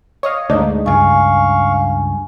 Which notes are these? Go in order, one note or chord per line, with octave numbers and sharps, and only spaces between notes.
C#5 D#5 F5
D2 G#2 D4 D#4
C#2 G2 F5 G#5 C#6